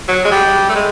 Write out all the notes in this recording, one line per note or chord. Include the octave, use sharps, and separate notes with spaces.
F#3
G#3
G3
A3
G#3